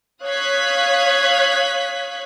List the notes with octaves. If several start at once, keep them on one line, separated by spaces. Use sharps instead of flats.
C#5 F5 D#6 F#6 G#6 B6